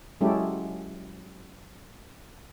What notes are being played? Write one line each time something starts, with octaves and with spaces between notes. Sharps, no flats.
F#3 G#3 C#4 E4 G4 A4